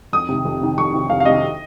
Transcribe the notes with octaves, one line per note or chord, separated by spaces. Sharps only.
F2 D#6
C3 D#3
F2
C3 D#3
F2 C#6
C3 D#3
F2 F5
F5
C3 D#3 D#5